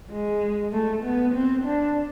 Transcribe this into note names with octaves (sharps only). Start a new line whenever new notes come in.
G#3
A3
B3
C4
D4